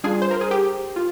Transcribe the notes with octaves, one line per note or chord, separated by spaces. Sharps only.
G3 D4 F4 G#4
C5
A#4
G#4
G4
F4